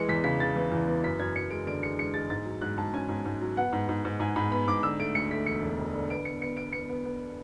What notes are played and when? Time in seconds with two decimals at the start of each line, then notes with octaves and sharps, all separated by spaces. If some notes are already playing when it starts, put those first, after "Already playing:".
Already playing: E3 G#3 C#7
0.09 E2 B6
0.24 C#3 B6
0.40 C#3 A6
0.56 E3
0.72 E2
0.87 E3
1.03 F#2 B6
1.19 F#2 G#6
1.35 F#2 C#7
1.50 G#3 D7
1.67 D3 D7
1.82 G#3 C#7
1.99 G#3 C#7
2.14 G#3 A6
2.30 G#2 A6
2.45 F#3
2.61 G#2 F#6
2.77 G#2 A5
2.94 C#4 G#5
3.09 G#2
3.25 G#2
3.41 F#3
3.56 B3 F#5
3.73 G#2
3.89 G#2
4.05 G#2
4.20 G#2 G#5
4.36 G#2 B5
4.51 B3 B5
4.67 G#2 D6
4.83 D3 E6
4.99 A3 D7
5.15 D2 C#7
5.31 A3 B6
5.46 E1 C#7
5.62 E1
5.78 E1
5.94 D3
6.10 B3 D7
6.25 B3 C#7
6.41 B3 C#7
6.57 B3 D7
6.73 B3 C#7
6.89 B3
7.05 B3